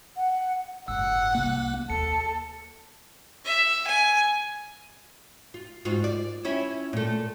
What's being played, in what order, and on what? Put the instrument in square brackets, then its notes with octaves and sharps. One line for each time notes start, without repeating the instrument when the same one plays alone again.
[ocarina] F#5
[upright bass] F#1 G#2 [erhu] F#5 [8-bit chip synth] E6
[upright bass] C2 [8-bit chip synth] A#3
[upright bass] D#2 [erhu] A4 [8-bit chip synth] C#7
[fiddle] E5
G#5
[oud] F4
G#2 F4 F#4
D5
C#4 E4 E5
A#2 A3